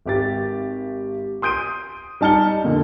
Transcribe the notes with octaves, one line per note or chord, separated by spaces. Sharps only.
G#1 G4 A6
C6 D#6 G6 D7 D#7
G3 D#4 A5 F6 C#7 G7
F2 A#2 D3